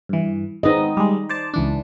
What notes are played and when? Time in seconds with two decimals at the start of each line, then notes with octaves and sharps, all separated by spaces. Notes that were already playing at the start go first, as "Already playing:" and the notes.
0.09 G2 E3
0.63 G#3 B3 C4 D#4 D#5
0.97 G3 G#3
1.29 C5 D5 A5
1.54 C#2 E3 D4